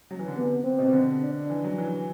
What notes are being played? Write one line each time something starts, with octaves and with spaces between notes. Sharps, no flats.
F#3
E3
D3
C3 B3
C4
B2
C3
D3
D4
E3
F#3
E3